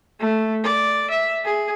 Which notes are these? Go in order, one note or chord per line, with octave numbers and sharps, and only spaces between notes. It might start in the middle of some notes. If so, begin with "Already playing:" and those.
A3
D5
E5
G#4